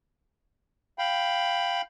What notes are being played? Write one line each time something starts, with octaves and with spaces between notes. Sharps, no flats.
F5 G5 B5